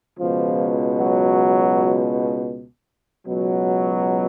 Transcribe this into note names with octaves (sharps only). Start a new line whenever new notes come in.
C#2 B2 F3
F#3
C#2 B2 F#3